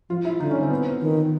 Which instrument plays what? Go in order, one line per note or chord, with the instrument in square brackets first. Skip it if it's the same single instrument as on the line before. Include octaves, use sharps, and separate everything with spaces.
[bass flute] F3 [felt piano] F4
[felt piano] E4
[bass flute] D3 [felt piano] D#4
[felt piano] C#4
C4
B3
[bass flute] D#3